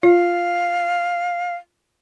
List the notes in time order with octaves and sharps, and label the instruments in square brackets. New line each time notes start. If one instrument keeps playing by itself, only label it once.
[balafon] F4 [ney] F5